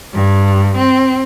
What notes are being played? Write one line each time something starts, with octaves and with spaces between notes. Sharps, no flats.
G2
C4